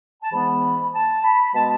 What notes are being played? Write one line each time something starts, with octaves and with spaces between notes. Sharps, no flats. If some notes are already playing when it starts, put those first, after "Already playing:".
A5
G#2 E3 G#3 B3 B5
A5
B5
B2 G#3 B3 A5